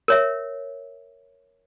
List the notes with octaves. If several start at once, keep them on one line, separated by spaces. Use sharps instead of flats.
A#4 C#5 E5